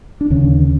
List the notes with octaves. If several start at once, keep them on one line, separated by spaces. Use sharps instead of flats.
D4
D#2 C#3 C#4